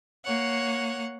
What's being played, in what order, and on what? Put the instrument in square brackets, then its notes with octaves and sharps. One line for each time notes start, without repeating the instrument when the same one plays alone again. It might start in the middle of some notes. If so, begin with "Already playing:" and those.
[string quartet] A#3 C#5 F#5